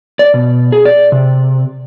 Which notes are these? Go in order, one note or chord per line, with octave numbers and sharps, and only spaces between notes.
D5
B2
G#4
D5
C3